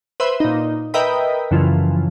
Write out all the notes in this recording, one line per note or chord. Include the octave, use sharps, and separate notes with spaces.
B4 C5 E5
A#2 D#4
A#4 B4 D#5 E5 G5 B5
F#2 C#3 E3 F3